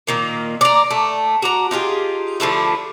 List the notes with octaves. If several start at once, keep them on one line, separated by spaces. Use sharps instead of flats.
A#2 D#3 A#3
D5 A#5
A3
F#4 D5 A#5
D#4 F4 G4 G#4
D3 F3 A3 E4